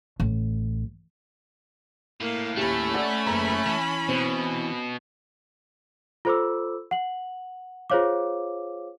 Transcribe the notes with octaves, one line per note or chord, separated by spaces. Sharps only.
A1
A2 A#3 F5
D#1 A3 C#4 G4 B5
D5 F#5 E6
F#1 G#3 B4 A#5
E3 A5
B2 C4
F4 A4 C5 B5 D6 E6
F#5 F#7
F4 G#4 C5 C#5 F5 D6